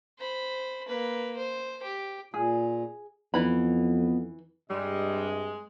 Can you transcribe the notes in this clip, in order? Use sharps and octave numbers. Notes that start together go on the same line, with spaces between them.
C5 B5
A#3 B4
C5
G4
A#2 G#4
F2 E3 B3 B5
G2 C3 G3 G#3 D#5